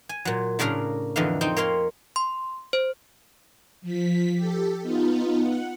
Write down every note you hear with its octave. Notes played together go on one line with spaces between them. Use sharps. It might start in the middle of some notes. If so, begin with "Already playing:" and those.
G#5
A#2 F#3
A2 C#3 D4 A#4 F5 A#5
F2 D3 E3 D#4 F5
C4 D#4 G5
A#3 C#5 F5 C6
C6
C5
F3 B6
G4 A4
B3 D#4 F4
F#5